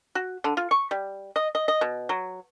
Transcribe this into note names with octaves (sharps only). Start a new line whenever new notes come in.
F#4
D3
F4
C#6
G3
D#5
D#5
D#5
B2
F#3